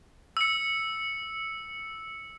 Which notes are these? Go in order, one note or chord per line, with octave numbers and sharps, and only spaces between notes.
E6 C#7